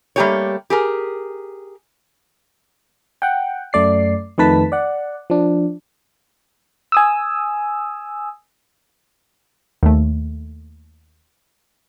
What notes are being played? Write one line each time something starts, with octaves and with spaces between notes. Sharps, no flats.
G3 A3 A#3 G4 G#4 C#5
G4 G#4 A#4
F#5 G5
F#2 A3 D5 C7
F2 D#3 A3 B4 A5 B6
D5 F#5
F3 D4
G#5 D#6 E6
D#2 A3